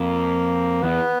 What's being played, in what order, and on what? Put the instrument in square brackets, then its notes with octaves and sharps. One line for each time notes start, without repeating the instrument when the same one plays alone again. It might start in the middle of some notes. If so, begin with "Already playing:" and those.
Already playing: [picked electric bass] F2 [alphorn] A#3
[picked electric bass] E2 [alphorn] B3